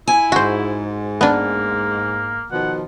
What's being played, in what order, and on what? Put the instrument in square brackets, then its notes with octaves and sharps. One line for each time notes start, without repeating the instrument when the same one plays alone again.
[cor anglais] E4 [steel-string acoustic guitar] G#5
[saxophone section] G#2 [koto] F#4 C5
[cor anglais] A#3 [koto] B3 D4
[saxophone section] B2 D#3 F3 [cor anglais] F#5